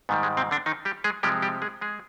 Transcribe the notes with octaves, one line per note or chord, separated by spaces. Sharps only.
G#2 D#3 G3 B3
G#3
C3 C4
D3 D4
D#3 D#4
G3 G4
G#3 G#4
C3 F3 G3 G#3 G4
G3 G4
G#3 G#4
G#3 G#4